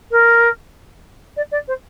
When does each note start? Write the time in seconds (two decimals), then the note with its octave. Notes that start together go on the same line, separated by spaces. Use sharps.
0.11 A#4
1.36 D5
1.51 D5
1.67 C5